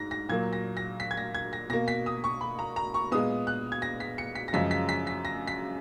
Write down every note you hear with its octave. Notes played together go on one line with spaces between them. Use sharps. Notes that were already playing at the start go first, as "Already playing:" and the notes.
Already playing: G#2 A#6
A#6
A#2 F#3 A#3 G#6
A#6
A#6
B6
G#6
A#6
G#6
A#6
B2 A#3 A#6
B6
D#6
C#6
B5
A#5
A#5
C#6
A#2 G#3 B3 D#6
F#6
G#6
A#6
B6
C#7
B6
A#6
F#2 C#3 F3 G#3 B6
B6
B6
B6
A#6
B6